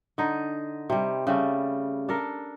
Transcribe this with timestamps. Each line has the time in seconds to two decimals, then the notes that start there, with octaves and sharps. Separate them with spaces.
0.18 D3 D#4
0.90 C3 G3
1.27 C#3 G3 A3
2.09 D4 A4 A#4